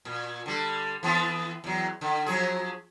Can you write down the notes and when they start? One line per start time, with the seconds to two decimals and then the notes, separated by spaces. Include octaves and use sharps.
0.05 A#2
0.46 D3 G3
1.03 E3 B3 C4
1.64 E2 F#3
2.01 D3
2.26 F3 F#3 G#4